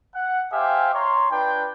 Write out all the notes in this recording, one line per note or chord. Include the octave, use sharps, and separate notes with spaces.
F#5
G4 C5 E5 F5 G#5
C#5 A#5 C6
D4 F4 B4 G5